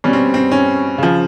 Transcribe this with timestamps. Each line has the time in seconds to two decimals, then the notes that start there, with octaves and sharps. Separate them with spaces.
0.04 B2 G3 C#4
0.13 C4
0.34 C4
0.52 C#4
0.98 C#3 F3